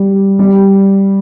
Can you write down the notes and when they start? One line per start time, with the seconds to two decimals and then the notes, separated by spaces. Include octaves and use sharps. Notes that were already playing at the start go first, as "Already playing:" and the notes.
Already playing: G3
0.39 G3